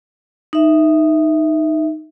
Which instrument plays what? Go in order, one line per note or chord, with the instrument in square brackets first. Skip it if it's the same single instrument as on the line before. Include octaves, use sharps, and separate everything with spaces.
[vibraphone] D#4 E5